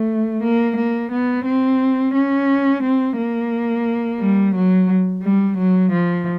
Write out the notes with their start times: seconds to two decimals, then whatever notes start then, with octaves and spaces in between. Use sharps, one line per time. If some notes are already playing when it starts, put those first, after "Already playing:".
Already playing: A3
0.43 A#3
0.77 A#3
1.12 B3
1.45 C4
2.14 C#4
2.83 C4
3.18 A#3
4.20 G3
4.56 F#3
5.23 G3
5.58 F#3
5.92 F3